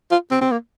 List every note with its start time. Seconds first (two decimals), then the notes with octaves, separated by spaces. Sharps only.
0.11 F4
0.31 C4
0.41 C4
0.51 A#3